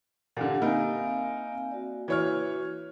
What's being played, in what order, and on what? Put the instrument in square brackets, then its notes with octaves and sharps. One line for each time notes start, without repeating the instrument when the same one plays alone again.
[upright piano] A#2 D3 [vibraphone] F4 G4 F#5
[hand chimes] A#3 [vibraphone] C4 F5 G#5 [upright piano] D#4 A#4
[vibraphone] F#4 D5
[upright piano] E3 C#5 F6 [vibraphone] F#4